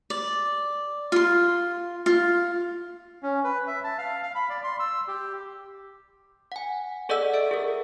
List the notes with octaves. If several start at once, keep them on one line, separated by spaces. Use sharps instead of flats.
D5
F4 C6
F4
C#4
B4
E5
A5
F5
F5
B5
D5
C6
E6
G4
F#5 G#5
G#4 A4 D5 D#5 F#5 E6
E5 D7
G#4 A#4